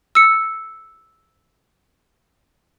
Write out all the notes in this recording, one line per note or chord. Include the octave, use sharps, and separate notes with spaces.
E6 C#7